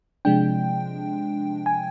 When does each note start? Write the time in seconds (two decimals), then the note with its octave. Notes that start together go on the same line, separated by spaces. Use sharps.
0.25 C3 F3 G#3 D4 G5
1.66 G#5